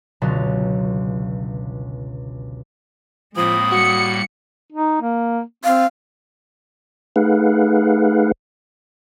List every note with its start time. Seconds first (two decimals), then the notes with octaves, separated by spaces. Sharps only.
0.21 G1 C#2 B2 F#3 A#5 A6
3.37 A2 F3 G#3 A#3 C4 B5 D#6
3.72 G3 F#4 C#7
4.73 D#4
5.02 A#3
5.64 C4 F5
7.16 A3 D#4 G#4 B4 F5 F#5